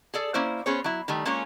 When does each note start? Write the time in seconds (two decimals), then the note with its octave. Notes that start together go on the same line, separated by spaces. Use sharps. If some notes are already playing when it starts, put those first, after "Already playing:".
0.14 G#4 A4 D5
0.34 A#3 C#4 E4 C5
0.66 B3 C#4 G#4 C5 C#5
0.84 F#3 E4
1.08 D#3 G3 A3
1.25 G#3 A#3 C#4 F4 C#5